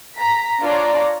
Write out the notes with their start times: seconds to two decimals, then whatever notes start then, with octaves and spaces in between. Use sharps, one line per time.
0.16 A#5 B6
0.61 D4 F4 C#5 D5 A#5